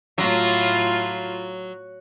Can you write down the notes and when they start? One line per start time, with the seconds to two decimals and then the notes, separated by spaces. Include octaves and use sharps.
0.18 A2 F#3 F4